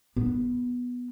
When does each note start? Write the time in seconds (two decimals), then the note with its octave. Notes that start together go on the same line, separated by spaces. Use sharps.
0.16 B3